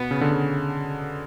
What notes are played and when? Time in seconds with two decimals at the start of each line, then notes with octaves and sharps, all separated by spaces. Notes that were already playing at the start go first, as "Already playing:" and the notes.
Already playing: B2 B3
0.11 C#3
0.21 D3
0.31 C#3